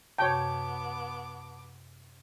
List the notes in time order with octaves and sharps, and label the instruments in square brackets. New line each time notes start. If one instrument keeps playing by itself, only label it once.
[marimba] F#2 C3 [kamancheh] B3 D6 [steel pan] C#5 G5 [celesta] A5